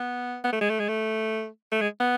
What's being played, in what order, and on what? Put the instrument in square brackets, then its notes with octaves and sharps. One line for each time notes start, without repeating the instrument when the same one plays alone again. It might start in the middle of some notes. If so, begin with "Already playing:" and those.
Already playing: [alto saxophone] B3
B3
A3
G#3
A3
G#3
A3
A3
G#3
B3